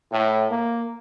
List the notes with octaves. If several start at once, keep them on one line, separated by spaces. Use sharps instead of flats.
A2
A#3